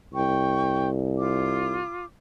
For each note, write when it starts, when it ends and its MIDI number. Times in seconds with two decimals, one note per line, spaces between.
0.13 1.81 36
0.13 0.88 79
0.13 0.88 85
1.19 2.05 65
1.19 2.05 86